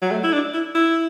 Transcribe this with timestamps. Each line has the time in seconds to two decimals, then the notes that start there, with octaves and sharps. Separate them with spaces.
0.02 F#3
0.11 A3
0.24 E4
0.33 D4
0.54 E4
0.75 E4